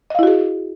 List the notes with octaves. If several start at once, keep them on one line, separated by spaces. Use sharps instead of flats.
E4 F#4 G#4 D#5 F5